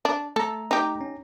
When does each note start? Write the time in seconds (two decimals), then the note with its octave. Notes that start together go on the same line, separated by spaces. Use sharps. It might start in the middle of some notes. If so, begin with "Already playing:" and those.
0.05 D4
0.36 A3 A4 A#5
0.71 D#4 G4
1.01 C#4